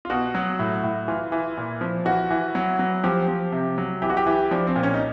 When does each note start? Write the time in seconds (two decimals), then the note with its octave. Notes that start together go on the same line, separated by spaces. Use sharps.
0.05 F4
0.10 B2 F#4
0.35 F#3
0.59 A2
0.83 A2
1.08 E3 F4
1.32 E3
1.57 A#2
1.81 F3
2.05 E3 F#4
2.31 E3
2.55 F#3
2.79 F#3
3.03 F3 G4
3.28 F3
3.52 C3
3.78 F#3
4.02 E3 G4
4.10 F#4
4.17 G4
4.26 E3
4.51 F3 D4
4.67 C4
4.76 A#2
4.83 C#4
4.94 D#4